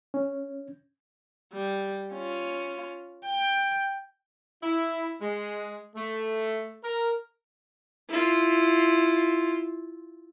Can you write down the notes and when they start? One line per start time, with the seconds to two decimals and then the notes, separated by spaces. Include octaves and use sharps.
0.14 C#4
1.53 G3
2.13 C#4 F4
3.25 G5
4.63 E4
5.21 G#3
5.95 A3
6.84 A#4
8.09 E4 F4